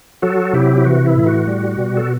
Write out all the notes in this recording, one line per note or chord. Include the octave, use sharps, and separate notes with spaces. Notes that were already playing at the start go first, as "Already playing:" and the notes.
F#3 F#4 A4
C3 E4 G4
E4
E3 F#4
E4
A2
F#4
G3
B2
A4